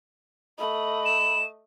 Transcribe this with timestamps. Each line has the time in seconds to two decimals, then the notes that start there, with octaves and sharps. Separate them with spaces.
0.59 A3 D#5 B5
1.05 E7